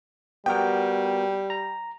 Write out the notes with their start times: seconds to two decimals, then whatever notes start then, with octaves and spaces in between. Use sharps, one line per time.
0.46 G3 B3 F#4 A#4 G5
1.50 A#5